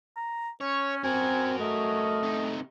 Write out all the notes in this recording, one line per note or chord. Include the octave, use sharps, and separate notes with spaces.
A#5
C#4 C#5
C4 F#4 A#4 G#5
A3 D#5
C3 D#4